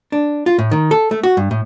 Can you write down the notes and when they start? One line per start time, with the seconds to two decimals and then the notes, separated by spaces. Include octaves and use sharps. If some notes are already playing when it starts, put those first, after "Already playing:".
0.12 D4
0.46 F4
0.58 A2
0.71 D#3
0.91 A4
1.11 A3
1.23 F#4
1.37 G2
1.51 A2